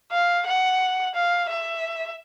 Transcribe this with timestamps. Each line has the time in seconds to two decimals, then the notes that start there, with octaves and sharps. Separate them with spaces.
0.12 F5
0.47 F#5
1.15 F5
1.49 E5